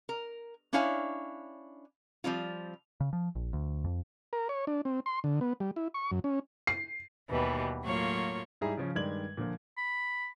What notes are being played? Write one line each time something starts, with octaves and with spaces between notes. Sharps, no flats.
A#4
C#4 D4 E4 C#5 F5 G#5
F3 G3 C4 F4
C#3
F3
A#1
D2
F2
A#4
C#5
D4
C4
C6
D3
B3
G3
E4
C#6
F#2
C#4
C7
D#2 B2 E3 G3 B3
A2 F#3 A#3 F4 C#5 C#6
G#2 G3 E4 G#4 A#5
C#3 F3 C#4
G2 D#3 G#3 D5 G#6 F#7
A#2 D3 F3
B5